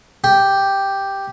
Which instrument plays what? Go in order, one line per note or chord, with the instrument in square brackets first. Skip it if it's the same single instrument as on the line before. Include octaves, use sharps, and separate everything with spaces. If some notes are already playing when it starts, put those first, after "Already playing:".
[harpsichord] G4